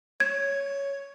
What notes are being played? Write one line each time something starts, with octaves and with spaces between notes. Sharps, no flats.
C#5 G#6